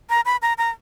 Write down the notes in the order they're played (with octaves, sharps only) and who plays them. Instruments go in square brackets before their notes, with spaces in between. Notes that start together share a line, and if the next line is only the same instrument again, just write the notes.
[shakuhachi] A#5
B5
A#5
A#5